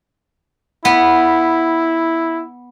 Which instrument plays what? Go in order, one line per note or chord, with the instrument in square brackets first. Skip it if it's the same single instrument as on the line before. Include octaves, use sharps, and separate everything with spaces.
[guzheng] B3 [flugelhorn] E4